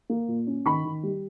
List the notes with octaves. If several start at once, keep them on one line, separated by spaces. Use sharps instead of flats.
A#3
A#2
C#4
D#3 B5 C#6
D#3
G3